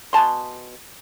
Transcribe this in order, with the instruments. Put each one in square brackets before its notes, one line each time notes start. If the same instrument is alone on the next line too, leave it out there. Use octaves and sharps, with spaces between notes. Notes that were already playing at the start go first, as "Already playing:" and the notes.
[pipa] B2 G#5 A5 C6